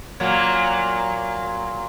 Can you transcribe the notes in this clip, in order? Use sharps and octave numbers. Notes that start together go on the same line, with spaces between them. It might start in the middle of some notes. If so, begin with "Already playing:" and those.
A#2 F#3 A#3